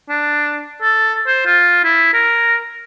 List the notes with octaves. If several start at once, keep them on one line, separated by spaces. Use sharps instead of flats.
D4
A4
C5
F4
E4
A#4